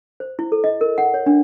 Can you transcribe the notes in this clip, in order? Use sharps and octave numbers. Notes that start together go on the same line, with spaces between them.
C5
E4
A4
D#5
A#4
F#5
C#5
D4